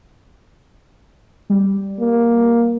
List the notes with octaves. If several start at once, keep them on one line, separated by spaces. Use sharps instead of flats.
G3
A#3